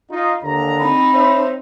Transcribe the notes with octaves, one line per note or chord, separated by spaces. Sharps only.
D#4 F4
D#2 D3 A#5
C4 D#4 B5
C5 C#5 E5